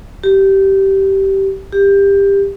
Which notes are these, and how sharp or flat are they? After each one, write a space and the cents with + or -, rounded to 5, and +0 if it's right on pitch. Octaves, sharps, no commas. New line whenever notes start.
G4 -15
G4 +20